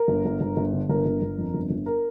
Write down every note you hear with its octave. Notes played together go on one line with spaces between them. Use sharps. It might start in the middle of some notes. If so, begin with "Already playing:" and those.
Already playing: A#4
G1
G1
G1
G1
D3
G1 A#4
G1
G1
F2
G1
G1
A#4